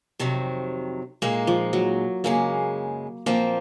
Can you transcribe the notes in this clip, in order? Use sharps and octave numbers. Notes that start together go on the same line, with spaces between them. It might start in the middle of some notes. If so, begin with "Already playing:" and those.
F2 C3 D#3 F#3
A#2 G#3 A#3 D#4
F3
F#3
F#2 C#3 G#3 A#3
A#2 F3 A#3 C4